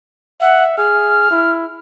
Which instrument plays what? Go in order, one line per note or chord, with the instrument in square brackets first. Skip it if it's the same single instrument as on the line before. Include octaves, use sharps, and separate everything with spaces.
[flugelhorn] E5 [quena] F#5
[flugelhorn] G#4 [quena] F6
[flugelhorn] E4